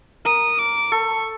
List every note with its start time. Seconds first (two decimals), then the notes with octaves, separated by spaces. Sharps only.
0.25 A#4 D#6
0.58 D6
0.92 A4 C#6